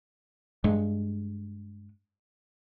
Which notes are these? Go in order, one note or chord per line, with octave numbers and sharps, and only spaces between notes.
G2 G#3